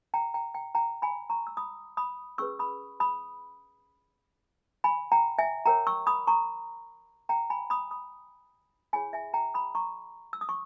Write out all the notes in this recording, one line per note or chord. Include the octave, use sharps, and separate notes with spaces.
G5 A#5
G5 A#5
G5 A#5
G5 A#5
G#5 B5
A#5 C#6
E6
B5 D#6
B5 D#6
C#4 G#4 B4 C#6 E6
B5 D#6
B5 D#6
G#5 B5
G5 A#5
E5 G#5
G4 A#4 C#5 G5 A#5
C#6 E6
B5 D#6
A#5 C#6
G5 A#5
G#5 B5
B5 D#6
B5 D#6
E4 G#4 C#5 G#5 B5
E5 G#5
G5 A#5
B5 D#6
A#5 C#6
E6
D#6
C#6